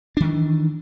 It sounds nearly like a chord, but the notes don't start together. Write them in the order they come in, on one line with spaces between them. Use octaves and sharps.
D4 D#3 E3